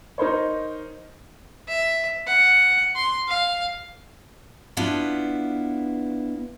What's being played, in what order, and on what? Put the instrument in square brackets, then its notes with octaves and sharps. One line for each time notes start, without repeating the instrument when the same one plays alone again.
[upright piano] D#4 A#4 C5 C#5
[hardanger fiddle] E5
F#5
C6
F5
[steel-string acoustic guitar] B3 D4 E4 F4 B4